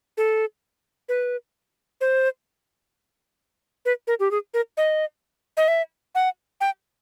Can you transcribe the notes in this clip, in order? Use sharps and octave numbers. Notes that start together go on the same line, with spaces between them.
A4
B4
C5
B4
A#4
G4
G#4
A#4
D#5
D#5
E5
F#5
G5